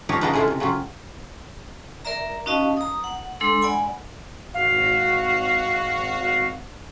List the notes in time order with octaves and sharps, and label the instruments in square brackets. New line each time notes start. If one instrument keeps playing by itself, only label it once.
[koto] F3 D#4 F4 G4 C#5
C#3 F3 A#3 B3 D4 D#4
G#3 A3 E4 F4 A4
C3
C#3 F#3 C4 F4
[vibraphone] A#4 D5 E5 A#5
C#4 D#4 F#4 D#5 F5 A5
A#5 D#6
F#5
G#3 D4 A4 C6 E6
D5 F#5 G#5 B5
[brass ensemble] G#1 F#4 [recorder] F5